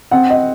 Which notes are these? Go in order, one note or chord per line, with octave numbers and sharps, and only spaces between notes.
C4 F#5
D#5